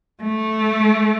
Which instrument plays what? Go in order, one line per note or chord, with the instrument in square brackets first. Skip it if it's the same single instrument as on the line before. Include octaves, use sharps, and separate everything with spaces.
[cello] A3